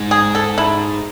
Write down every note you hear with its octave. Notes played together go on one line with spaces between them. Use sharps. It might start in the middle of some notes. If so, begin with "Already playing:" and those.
Already playing: G#2
G#4
A4
E4